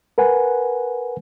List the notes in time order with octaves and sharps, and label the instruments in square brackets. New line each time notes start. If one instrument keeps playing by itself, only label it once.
[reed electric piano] A#4 B4 F#5 G#5